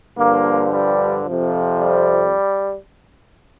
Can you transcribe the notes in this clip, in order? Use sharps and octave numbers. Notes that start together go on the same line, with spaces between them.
G2 D3 F3 A#3
G3
F2 C3 F3
G3